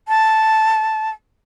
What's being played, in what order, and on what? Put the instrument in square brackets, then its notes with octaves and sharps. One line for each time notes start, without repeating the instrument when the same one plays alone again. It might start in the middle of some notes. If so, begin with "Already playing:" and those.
[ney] A5